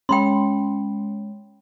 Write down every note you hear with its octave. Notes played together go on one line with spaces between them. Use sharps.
G#3 C#4 G5 B5 C6